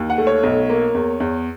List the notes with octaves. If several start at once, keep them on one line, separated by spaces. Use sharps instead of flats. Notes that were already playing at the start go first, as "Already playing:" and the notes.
Already playing: D#2
F#5
A3
C#5
B1
A#3
E2
E2